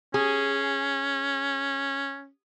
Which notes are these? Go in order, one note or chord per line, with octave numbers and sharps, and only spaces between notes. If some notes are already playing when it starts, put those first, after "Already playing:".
C#4 G#4